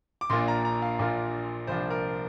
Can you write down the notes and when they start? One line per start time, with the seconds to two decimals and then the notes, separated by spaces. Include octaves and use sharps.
0.21 D6
0.30 A#1 A#2 A#3 D4 F4 C6
0.48 A#5
0.65 A#5
0.82 F5
0.99 A#1 A#2 A#3 D4 F4
1.67 C2 A#2 F3 D4 C5
1.90 A#4